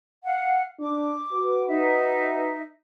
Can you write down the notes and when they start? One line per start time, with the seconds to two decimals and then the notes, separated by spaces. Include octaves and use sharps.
0.24 F5 F#5
0.80 D4 D6
1.33 F#4 B4
1.68 D#4 E5